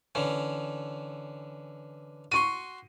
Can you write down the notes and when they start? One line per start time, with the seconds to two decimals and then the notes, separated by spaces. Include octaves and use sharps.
0.15 D3 E3 C#4
2.32 F#4 C6 C#6 D#7